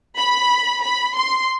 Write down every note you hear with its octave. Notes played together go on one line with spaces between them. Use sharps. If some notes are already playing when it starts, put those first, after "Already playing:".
B5
B5
C6